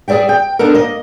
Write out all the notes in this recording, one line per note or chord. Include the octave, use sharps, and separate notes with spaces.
G#4 A4 D5 E5 G5
G5
B3 D4 D#4 A4 A#4
A#3 D#5